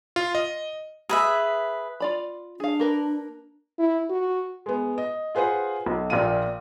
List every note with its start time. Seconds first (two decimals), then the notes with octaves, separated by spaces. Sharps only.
0.16 F4
0.35 D#5
1.09 G#4 B4 E5
2.00 F4 D5 B5
2.60 D4 G#4 F5
2.80 A#3 A#4 B4
3.78 E4
4.10 F#4
4.66 G#3 B3
4.98 D#5
5.35 F4 G#4 B4 C5 F#5
5.86 B1
6.10 A#1 A#2 F4 D#7